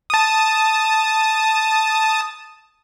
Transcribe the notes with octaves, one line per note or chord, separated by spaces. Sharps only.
A5 D#6